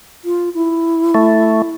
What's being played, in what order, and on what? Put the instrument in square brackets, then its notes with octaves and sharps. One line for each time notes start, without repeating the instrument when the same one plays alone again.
[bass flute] F4
E4
[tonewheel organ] A3